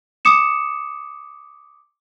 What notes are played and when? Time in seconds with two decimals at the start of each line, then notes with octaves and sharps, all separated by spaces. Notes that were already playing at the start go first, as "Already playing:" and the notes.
0.25 D6 D#6 C#7 E7